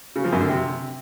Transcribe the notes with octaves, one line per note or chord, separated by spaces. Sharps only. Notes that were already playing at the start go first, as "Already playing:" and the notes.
C#3
F3
F#2
D3
C3